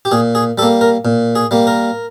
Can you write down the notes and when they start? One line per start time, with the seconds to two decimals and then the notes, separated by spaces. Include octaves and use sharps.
0.05 G4
0.11 A#2 G#4
0.35 G#4
0.58 G3 A4
0.62 A#3
0.81 A#4
1.05 A#2
1.35 G#4
1.51 G3 A#3
1.67 A#4